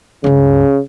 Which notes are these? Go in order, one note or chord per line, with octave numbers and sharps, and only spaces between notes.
C#2 G2 C#3